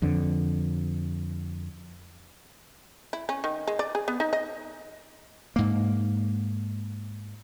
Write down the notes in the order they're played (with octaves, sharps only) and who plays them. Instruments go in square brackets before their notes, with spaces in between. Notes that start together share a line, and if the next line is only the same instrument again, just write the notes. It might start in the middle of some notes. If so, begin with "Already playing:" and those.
[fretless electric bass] F2 D3
[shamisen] E4
C#4
D#3
G#3
D5
G#4
B3
D#4
D#5
[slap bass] G#2 A#3